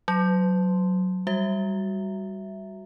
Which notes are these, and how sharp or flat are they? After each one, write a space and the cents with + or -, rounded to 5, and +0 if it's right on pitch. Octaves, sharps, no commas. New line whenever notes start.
F#3 +0 C6 +0
G3 +0 F#4 +0 E5 +0